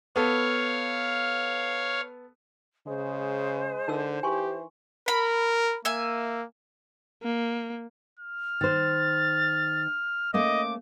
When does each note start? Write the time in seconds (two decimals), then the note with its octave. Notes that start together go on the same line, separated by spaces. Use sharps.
0.16 B3 A4 C#5 F5
2.87 C#3 G#3 C5
3.88 D3 D#4 A#4 E6
4.23 E3 G4 G#5 C6 C#6
5.08 A#4 B5
5.85 A#3 E5 G#5
7.23 A#3
8.20 F6
8.61 D#3 C5 A6
10.34 A3 A#3 C#4 D#5 D6